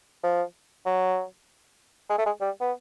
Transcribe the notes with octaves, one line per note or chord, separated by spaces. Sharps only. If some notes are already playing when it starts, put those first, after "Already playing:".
F3
F#3
G#3
A3
G#3
G3
B3